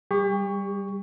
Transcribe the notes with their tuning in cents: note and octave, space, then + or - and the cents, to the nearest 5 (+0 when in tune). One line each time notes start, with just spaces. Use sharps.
G3 +0 G4 +40 C#6 +10